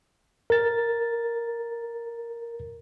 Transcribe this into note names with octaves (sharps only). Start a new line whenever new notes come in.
A#4 A6